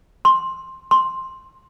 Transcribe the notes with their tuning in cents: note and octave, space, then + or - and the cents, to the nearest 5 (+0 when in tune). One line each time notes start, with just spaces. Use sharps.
C6 +10
C6 +5